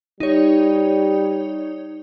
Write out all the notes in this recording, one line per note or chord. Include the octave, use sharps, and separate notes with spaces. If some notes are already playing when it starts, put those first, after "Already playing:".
G3 D#4 C#5